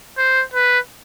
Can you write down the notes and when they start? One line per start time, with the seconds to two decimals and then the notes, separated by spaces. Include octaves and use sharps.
0.18 C5
0.54 B4